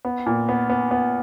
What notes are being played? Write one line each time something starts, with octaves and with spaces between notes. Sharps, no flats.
B3
A#2
B3
B3
B3